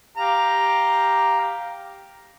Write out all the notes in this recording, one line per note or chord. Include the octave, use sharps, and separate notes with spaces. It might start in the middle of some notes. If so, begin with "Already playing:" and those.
G4 F5 A#5